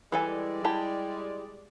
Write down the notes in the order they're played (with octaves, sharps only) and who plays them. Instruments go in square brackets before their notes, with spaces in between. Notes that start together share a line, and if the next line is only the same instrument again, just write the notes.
[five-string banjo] E3 A4 G#5 [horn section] G3 G#3 D5
[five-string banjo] E4 G4 A5